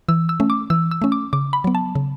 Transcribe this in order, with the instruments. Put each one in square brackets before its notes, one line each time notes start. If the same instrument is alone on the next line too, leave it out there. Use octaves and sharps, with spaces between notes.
[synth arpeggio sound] E3 E6
E6
A3 C#4
D6
E3 E6
E6
A3 C#4
D6
C#3 D6
B5
F#3 B3
A5
C#3